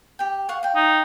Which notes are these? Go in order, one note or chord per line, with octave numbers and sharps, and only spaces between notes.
G4 G5
F5 F#5 C#6
F5 G5
D#4